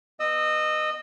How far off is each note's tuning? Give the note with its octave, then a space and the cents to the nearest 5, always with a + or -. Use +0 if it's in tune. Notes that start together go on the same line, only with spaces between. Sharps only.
B3 +0 D#5 -20 E6 -25